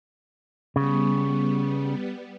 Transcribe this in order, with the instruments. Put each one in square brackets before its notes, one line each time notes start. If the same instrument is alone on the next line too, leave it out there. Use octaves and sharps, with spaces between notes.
[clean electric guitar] C#3 [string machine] G3 B3